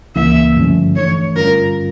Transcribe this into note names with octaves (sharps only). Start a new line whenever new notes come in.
C#2 C#3 E3 A#3 E5
G2 D3 F3 A3 C#4
E3 A3 D4 C#5
G2 D3 G3 C#4 F4 A#4